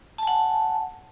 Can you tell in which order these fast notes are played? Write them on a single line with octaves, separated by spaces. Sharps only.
A5 G#5 F#5